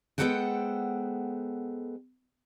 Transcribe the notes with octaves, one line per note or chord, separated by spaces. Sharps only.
G#3 B3 A4 C5 F#5 G5